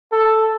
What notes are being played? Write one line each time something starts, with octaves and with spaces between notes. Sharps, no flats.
A4